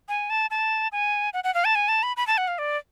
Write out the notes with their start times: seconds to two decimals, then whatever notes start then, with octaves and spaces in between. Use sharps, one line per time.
0.09 G#5
0.30 A5
0.51 A5
0.92 G#5
1.34 F#5
1.44 F#5
1.54 F5
1.65 A5
1.75 G#5
1.88 A5
2.03 B5
2.17 B5
2.27 A5
2.38 F#5
2.48 F5
2.58 D5